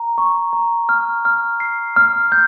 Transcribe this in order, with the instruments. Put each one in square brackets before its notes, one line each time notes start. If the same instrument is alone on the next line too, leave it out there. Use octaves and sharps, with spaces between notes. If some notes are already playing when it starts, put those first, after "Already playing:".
Already playing: [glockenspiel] A#5
C#6
A#5
F6
F6
C7
F6
G6